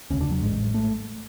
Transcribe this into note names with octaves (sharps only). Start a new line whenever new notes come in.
E1 D2 C#3 C#4
D4
F#3
A1 G#2 G#3
A3